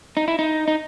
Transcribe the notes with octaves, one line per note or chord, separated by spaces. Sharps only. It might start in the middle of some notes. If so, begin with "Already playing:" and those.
D#4
E4
D#4
D#4